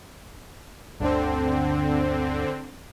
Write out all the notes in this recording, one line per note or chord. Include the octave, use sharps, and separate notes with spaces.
G1 D2 D3 C4 D4